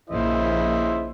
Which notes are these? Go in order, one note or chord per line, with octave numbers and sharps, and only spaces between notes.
A#1 C#3 E4 C5 D#5 E5